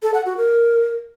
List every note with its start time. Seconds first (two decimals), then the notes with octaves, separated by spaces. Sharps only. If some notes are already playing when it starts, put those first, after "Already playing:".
0.03 A4
0.14 F#5
0.26 F#4
0.37 A#4